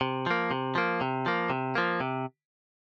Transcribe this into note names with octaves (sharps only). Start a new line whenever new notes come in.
C3
F3 A#3
C3
F3 A#3
C3
F3 A#3
C3
F3 A#3
C3